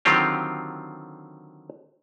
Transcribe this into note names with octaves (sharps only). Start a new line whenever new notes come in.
D3 D#3 F#3 C4 F4 G4